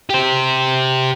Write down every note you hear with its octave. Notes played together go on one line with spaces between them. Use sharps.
G4 C5